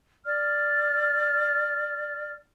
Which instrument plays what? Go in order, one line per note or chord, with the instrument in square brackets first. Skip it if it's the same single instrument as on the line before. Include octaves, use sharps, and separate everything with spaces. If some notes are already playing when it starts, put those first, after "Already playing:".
[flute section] D5 F6